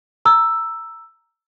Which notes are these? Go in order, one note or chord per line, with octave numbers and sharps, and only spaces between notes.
A#5 E6